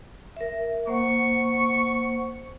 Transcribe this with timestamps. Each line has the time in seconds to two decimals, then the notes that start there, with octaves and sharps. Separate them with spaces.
0.37 A#4 E5
0.87 A#3 C5 F#5 C#6